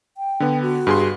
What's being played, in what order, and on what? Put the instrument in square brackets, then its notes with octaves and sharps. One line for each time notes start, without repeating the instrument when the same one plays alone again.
[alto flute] G5
[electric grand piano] D3 B3
[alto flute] F#4
[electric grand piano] G2 G#4 C6